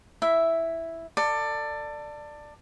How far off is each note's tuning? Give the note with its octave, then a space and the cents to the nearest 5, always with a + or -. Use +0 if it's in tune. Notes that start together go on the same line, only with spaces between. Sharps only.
E4 +0 E5 +0
A4 +25 D5 +15